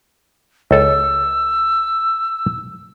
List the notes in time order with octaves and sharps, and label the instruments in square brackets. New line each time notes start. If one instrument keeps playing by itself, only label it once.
[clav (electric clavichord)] C#2 A4 [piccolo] E6